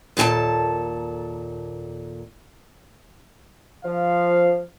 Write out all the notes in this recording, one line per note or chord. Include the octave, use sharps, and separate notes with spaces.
D#2 A#2 G4 A4 A5
F3 F5